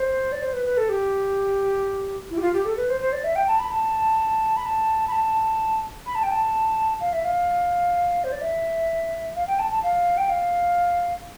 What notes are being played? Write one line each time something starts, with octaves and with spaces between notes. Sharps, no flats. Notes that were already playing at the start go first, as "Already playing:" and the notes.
Already playing: C5
D5
C5
B4
B4
A4
G4
E4
G4
F4
G4
A4
B4
C5
C5
D5
E5
G5
A5
B5
A5
B5
A5
B5
A5
B5
A5
G5
A5
F5
E5
F5
C5
D5
E5
F5
G5
A5
A5
F5
G5
F5